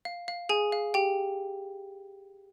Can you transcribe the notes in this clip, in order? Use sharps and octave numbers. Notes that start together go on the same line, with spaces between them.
F5
F5
G#4 G#5
F5
G4 G5